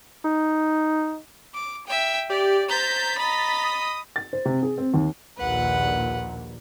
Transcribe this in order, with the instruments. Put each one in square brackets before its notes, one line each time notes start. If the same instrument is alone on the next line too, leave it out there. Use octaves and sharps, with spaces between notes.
[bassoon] D#4
[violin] D6
E5 G5
[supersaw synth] G4 [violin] D5
[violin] C5 G6 [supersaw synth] A#5 A6 B6
[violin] D#5 B5
[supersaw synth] D#6
[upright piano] A6
C5
C3
G#4
C4
D#2
[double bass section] A#1 D#2 A#2 [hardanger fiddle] B4 F#5